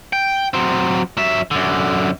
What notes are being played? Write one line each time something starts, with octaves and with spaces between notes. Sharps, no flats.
G5
F#3 C4
F#3 E5
F#2 D3